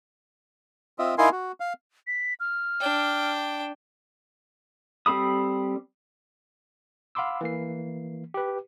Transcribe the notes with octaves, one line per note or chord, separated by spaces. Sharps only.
C4 F4 D#5 E5
D#4 E4 A#4 F5 G#5 C6
F#4
F5
B6
F6
D4 G5
G3 C4 A4 B5 D#6
F5 F#5 B5 C6 D6 E6
E3 A#3 C7
G4 B4